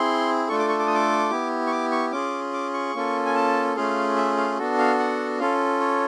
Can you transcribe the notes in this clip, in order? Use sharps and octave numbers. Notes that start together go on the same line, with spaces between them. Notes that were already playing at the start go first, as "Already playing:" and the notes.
Already playing: C4 E4 G#4 C6
A3 D4 F4 A4 C#6
D6
C#6
D6
D#6
D6
B3 E4 G4
C#6
D6
C#6
C#4 F4 G#4 D6
D6
C#6
A#3 C#4 F4 A4
G#5
A5
A3 C#4 F4 G#4 F5
E5
F5
B3 D4 F#4 A4
F5
F#5
C#4 F4 A4 F5
C#5